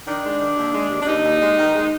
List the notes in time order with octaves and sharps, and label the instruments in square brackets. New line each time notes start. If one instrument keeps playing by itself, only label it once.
[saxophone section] D#3 D4
G#3
D#3
D#2
G#3
D#2
D4
D#2 D#4
D#2
G#3
D#3
G#3